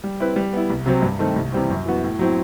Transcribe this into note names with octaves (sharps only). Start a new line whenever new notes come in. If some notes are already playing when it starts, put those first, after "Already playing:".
G3
C4 E4 B4
G3
B3 E4
C2
C3 F#3 C4
G2
D#3 A3 C4
C2
C3 E3 G3 C4
F#2
E3 B3 F#4
A2
F#3 C4 E4